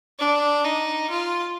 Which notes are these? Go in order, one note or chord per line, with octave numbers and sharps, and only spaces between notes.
D4
D#4
F4